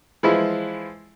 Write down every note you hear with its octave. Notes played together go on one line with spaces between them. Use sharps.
E3 F3 G#3 E4